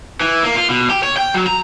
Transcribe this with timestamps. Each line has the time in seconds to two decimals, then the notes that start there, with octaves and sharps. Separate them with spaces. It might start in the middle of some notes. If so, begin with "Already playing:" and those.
0.20 E3
0.43 A#3
0.56 F4
0.69 B2
0.90 G4
1.03 C#5
1.17 G5
1.34 F#3
1.47 A#5